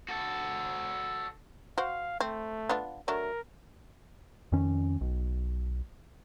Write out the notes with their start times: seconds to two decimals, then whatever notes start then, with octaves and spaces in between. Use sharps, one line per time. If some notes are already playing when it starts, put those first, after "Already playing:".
0.08 F#4 A4
1.78 F#4 C5 F5
2.20 A3 C4
2.69 B3 D4 F4
3.08 F#3 A3 D4 A#4
4.52 F2 D#3 C#4
5.01 B1